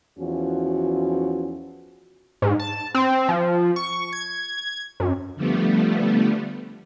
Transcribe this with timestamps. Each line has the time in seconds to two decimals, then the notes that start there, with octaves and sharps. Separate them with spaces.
0.19 E2 E3 F3 C#4 F#4
2.42 G#2
2.60 A5
2.94 C4
3.29 F3
3.76 C#6
4.13 G#6
5.00 F#2
5.36 D3 F3 G3 A3 B3